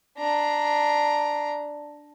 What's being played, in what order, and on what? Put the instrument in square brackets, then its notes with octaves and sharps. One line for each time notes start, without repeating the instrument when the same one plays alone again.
[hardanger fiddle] D4 A#5